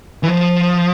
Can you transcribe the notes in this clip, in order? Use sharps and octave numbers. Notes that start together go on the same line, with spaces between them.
E3
F3